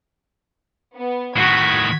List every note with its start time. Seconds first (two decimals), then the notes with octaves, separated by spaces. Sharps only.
0.96 B3
1.37 A2 D#3 F#4 G#6 B6